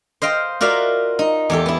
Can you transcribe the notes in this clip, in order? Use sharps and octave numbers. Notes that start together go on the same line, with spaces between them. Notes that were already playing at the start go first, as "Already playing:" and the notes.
C5 D#5 F5 G5
F4 F#4 A#4 D5 E5 F5
D#4
E2 G4 A4
B3 E4